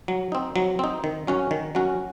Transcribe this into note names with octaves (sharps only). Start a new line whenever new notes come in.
F#3
C4 D#4
F#3
C4 D#4
D#3
F#3 C#4 F#4
D#3
F#3 C#4 F#4